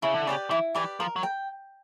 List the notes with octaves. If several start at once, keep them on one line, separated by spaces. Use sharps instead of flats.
C#3 E4
D3
C#3 G4 B4 D5
E3 E4
E3 G4 B4 D5
F3 A#4
F#3
G5